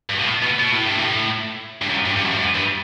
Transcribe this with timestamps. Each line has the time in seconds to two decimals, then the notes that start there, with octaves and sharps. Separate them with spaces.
0.10 G2
0.19 B2
0.25 A2
0.42 B2
0.59 B2
0.71 A2
0.85 G2
0.99 A2
1.81 G2
1.89 F#2
2.05 G2
2.16 G2
2.22 F#2
2.31 G2
2.38 F#2
2.54 G2